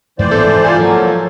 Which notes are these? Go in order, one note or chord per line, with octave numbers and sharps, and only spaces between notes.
F#2 A2 E3 F3 C5 D5
D1 A#1 B3 A4
G#2 C3
F4 A4 G#5
F3 F#3 A#3